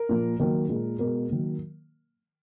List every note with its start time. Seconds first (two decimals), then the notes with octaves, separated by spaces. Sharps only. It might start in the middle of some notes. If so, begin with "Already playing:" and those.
Already playing: A#4
0.09 A#2 F3 A#3
0.39 D#3 F#3 A#3 A#4
0.69 A#2 G#3
0.99 B2 G#3 A#4
1.30 D#3 F#3 A#3